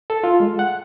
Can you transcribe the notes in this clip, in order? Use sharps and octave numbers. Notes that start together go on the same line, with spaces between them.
A4
F4
G#3
F#5